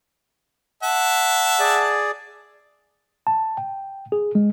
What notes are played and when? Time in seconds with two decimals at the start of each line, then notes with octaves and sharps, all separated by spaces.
0.83 E5 F#5 A5
1.60 G#4 D5
3.27 A5
3.57 G5
4.12 G#4
4.35 G#3